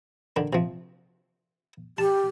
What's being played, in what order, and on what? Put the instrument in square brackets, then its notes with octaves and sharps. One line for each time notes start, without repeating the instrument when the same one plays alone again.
[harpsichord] D3 D#3 D4
C3 F3
[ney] G4 [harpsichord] A5